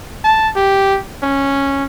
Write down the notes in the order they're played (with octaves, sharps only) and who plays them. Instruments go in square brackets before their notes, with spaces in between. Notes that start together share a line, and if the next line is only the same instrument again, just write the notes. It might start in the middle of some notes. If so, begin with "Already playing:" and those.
[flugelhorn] A5
G4
C#4